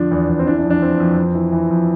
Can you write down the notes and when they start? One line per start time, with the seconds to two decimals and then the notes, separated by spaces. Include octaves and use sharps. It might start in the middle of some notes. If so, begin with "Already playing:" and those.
Already playing: F2 D3 F3 D4
0.11 E2
0.29 E2
0.39 C4
0.47 E3 D4
0.59 D4
0.64 F2
0.70 D4
0.82 F2 C4
1.00 F2
1.17 F2
1.35 E3
1.52 E3
1.70 F2